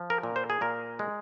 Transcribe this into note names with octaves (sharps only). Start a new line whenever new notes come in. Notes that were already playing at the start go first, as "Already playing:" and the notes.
Already playing: F3
A#4
A#2
C5
G#4
A#2 A#4
G#3